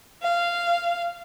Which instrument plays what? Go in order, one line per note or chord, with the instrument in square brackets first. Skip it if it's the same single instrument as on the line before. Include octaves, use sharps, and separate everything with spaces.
[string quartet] F5